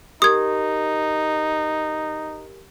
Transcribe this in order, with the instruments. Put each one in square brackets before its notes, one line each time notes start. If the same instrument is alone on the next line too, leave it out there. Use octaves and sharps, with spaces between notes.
[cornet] D#4 [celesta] G4 A#4 [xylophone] D#6 G#6